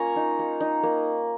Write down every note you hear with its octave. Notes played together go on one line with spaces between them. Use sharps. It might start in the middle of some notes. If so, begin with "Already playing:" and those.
Already playing: A#3 C#4 F4 D#5 G#5 A#5 C#6
D#4
A#3
D#4
A#3